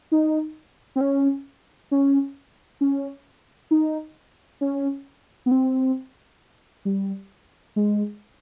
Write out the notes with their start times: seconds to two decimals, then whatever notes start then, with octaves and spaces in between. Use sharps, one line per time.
0.12 D#4
0.96 C4
1.01 C#4
1.91 C#4
2.81 C#4
3.71 D#4
4.61 C#4
5.46 B3
5.51 C4
6.85 G3
7.76 G#3